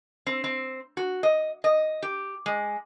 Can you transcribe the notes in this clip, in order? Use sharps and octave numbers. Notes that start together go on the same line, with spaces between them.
C4
C4
F#4
D#5
D#5
G4
G#3